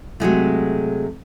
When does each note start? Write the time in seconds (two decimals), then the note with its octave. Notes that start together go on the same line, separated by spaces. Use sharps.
0.20 C3 F#3 G#3 A3